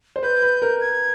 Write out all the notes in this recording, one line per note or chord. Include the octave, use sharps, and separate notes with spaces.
C5
B4 G6
B4
A#4
G#6